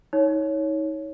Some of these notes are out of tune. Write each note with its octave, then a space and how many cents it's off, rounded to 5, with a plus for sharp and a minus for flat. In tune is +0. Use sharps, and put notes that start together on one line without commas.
D#4 +30 C#5 +0